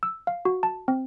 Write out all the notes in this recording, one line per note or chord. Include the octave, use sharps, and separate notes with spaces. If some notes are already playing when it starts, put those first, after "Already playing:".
E6
F5
F#4
A5
C4